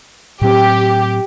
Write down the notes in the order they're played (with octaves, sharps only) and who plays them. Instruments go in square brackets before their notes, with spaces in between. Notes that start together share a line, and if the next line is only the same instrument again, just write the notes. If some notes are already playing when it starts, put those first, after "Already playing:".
[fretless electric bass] A2 F#3 C4 [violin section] G4